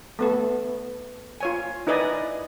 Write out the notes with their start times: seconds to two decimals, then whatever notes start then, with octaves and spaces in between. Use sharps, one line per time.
0.19 A3 B3 A4
1.41 F4 C#5 G#5
1.87 D#4 E4 B4 D5 D#5 G#5